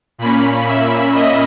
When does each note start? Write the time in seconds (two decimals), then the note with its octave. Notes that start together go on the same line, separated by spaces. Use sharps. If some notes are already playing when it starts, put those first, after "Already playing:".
0.18 A#2 A#3 C#4 B5
0.66 E5
1.14 D#5